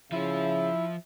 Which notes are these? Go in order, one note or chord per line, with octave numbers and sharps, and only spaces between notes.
C#3 F3 E4 E5